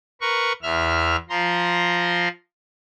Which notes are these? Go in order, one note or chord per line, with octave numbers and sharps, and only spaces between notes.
A#4 B4 C#6
E2 E5 F6
F3 A#5 C6